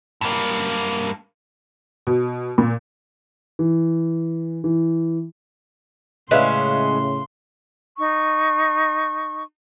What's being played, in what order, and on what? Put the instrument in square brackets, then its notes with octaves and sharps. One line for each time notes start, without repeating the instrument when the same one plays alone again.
[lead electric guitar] G2 A#3
[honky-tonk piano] B2
A#2
[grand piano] E3
E3
[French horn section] A2 C#3 [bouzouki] G#3 C#4 [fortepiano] B4 E5 F5 [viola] C6
[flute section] D#4 C#6